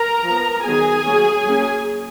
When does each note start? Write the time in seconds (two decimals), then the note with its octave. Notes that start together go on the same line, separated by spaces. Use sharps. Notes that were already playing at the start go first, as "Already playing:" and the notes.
Already playing: A#4 A#5
0.23 F3
0.29 B3
0.64 D#3 F#3 B3 G#4 G#5
1.05 F#3 A#3 C#4
1.46 F#3 A#3 C#4